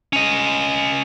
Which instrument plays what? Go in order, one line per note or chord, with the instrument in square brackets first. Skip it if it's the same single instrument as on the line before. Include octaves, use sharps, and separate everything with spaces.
[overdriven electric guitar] C#4 D#5